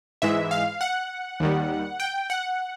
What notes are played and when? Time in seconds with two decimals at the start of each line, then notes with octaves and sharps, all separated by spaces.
0.22 G#2 E3 G#3 E5
0.51 F5
0.81 F#5
1.40 D#2 D#3 G3
2.00 G5
2.30 F#5